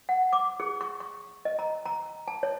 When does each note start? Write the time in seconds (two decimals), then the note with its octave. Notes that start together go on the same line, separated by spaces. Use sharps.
0.09 F#5
0.33 D6
0.60 G#4
0.81 C#6
1.00 C#6
1.45 D#5
1.59 A#5
1.86 A#5
2.28 A5
2.43 C#5